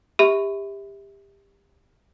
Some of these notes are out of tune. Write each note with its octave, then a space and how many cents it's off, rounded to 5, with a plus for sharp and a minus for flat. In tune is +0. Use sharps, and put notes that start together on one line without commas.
G4 +25 E5 -25 B5 +30